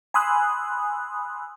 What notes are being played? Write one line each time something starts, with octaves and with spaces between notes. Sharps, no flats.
G#5 B5 C6 D#6 E6 F#6